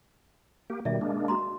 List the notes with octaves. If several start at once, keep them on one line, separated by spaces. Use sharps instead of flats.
A#3 G4
B2 D#3 G3 D5 E5
G#3 A#3 D4
F#4 A#5 C6